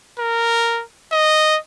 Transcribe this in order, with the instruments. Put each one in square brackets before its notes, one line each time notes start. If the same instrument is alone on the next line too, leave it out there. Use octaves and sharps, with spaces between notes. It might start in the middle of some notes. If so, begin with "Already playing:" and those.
[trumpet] A#4
D#5